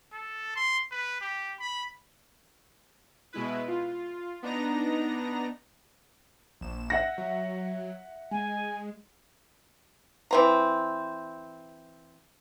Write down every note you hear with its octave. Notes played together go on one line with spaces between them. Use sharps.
A4
C6
B4
G4
B5
B2 G#3 E4 B4
F4
B3 D4 D#4 A#5 A#6
A#1 E7
E5 F#5 A#6
F#3
G#3 G#5
E3 C4 A#5